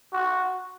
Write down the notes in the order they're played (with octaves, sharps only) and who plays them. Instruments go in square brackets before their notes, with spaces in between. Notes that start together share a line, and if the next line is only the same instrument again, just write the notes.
[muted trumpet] F#4